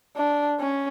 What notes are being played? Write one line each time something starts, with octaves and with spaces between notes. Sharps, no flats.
D4
C#4